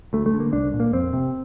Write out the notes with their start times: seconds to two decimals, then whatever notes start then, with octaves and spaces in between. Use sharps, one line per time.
0.13 D2 A3
0.26 A3
0.34 D3
0.40 A#3
0.53 C2 D4
0.74 A#2
0.80 A#3
0.93 F2 C4
1.13 C3